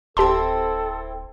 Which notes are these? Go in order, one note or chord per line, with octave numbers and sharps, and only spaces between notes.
D1 C4 E4 G4 A4 A5 C6